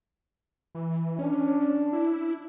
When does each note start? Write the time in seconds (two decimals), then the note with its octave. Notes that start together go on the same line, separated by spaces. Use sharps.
0.75 E3
1.19 C#4 D4
1.93 E4